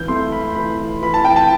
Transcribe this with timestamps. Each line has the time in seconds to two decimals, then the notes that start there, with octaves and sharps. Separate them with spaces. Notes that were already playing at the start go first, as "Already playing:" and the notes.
Already playing: E3 G6
0.08 A3 C6
0.32 B5
0.55 E3 B5
1.02 E3 B5
1.14 A5
1.25 G5
1.36 A5